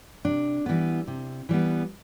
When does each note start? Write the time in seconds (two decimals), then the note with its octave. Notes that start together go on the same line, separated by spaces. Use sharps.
0.25 C3 D4
0.66 E3 G3 B3
1.08 C3
1.49 E3 G3 B3